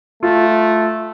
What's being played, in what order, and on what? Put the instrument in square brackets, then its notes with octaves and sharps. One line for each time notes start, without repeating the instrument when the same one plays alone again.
[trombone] A3 [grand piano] F4